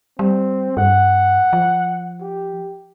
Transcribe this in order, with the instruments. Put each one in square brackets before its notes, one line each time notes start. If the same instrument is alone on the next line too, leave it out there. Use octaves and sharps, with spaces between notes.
[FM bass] G3 [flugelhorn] C4
[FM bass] G2 [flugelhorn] F#5
[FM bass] F3
[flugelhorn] G4